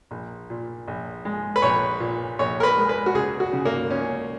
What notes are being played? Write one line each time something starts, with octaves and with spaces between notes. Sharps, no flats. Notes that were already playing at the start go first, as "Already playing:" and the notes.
A#1
A#2
A#1
G#3
B4
A#1 C#5
A#2
A#1 C#5
A#4
B4
G#3
B4
F#4
C#2 G#4
F#4
C#3
A#3
C#2 C#4